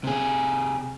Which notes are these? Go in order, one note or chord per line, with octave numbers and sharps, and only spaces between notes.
C3 G#4